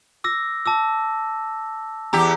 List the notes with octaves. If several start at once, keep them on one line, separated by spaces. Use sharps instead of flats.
D6 E6 A#6
A5 D6 E6
E2 G4 A#5